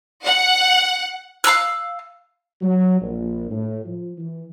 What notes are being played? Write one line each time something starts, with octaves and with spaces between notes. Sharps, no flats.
F#5
F5 A#5 E6 F#6
F#3
A#1
A2
F3
E3